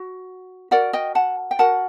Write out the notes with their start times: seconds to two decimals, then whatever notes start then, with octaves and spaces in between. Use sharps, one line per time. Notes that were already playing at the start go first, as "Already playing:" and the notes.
Already playing: F#4
0.71 F#4 A#4 D5 F#5
0.93 D#5 G5
1.15 F#5 A5
1.51 G5
1.59 F#4 A#4 F#5 A5